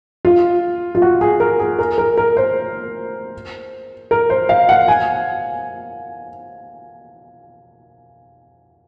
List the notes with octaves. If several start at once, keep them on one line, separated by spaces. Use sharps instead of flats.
F4
F4
F#4
G#4
A#4
G#4
A#4
A#4
A#4
C5
A#4
C5
F5
F#5
G#5